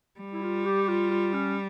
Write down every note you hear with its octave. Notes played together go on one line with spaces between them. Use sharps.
G3
E4
F4
G4
F4
F4
C#4